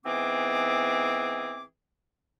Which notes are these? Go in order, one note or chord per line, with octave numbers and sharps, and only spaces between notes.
G#2 E3 B3 C4 G#4 D6